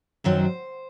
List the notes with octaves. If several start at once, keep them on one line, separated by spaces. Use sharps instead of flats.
F#2 D#3 F#3 C5